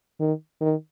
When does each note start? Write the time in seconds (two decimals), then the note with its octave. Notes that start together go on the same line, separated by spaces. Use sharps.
0.20 D#3
0.61 D#3